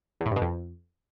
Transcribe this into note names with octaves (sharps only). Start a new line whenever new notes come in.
E2
A2
G2
B2
F2